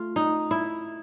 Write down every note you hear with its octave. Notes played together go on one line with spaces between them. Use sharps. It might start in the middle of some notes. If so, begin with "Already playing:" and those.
Already playing: A3 F4
D#4
E4